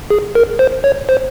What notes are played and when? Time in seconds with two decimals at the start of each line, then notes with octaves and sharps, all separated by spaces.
0.10 G#4
0.35 A#4
0.59 C5
0.84 C#5
1.09 C5